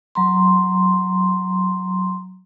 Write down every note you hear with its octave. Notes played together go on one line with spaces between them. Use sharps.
F#3 A#5 C6